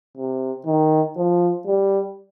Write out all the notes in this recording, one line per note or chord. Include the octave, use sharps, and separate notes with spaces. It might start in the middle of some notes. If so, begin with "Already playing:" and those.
C3
D#3
F3
G3